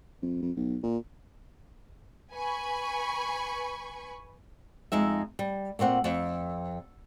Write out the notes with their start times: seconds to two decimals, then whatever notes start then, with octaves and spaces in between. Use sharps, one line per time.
0.22 F2
0.42 F2
0.57 B1
0.83 A#2
2.32 B4 G#5 B5 C#6
4.92 F2 G#3 D#4 E5
5.39 G3
5.79 A#2 A3 C4 F#5
6.04 F2